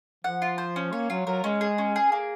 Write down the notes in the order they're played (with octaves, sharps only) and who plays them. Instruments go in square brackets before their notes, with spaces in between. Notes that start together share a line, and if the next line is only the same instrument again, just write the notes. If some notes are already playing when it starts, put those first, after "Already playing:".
[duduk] F3 [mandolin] F#5
[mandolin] F4
C5
C#4
[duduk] A#3 [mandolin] C#5
[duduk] F#3 [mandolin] F4
[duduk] F#3 [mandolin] A#4
[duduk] G#3 [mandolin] C#4
[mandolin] G#4
C#4
G#4
A#3